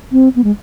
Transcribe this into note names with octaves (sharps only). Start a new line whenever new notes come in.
C4
B3
G#3